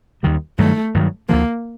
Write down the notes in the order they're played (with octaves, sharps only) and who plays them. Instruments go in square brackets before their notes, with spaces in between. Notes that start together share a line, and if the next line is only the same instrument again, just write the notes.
[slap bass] D#2 D#3 G3
[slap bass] G2 D#3 F#3 [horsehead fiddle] A3
[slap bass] G2 D#3 F#3
[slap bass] D2 D3 F3 [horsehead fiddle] A#3